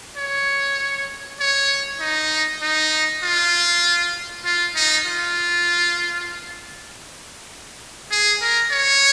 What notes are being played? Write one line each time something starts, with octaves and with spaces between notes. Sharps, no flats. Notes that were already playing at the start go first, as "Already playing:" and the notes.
C#5
C#5
D#4
D#4
F4
F4
D#4
F4
G#4
A#4
C#5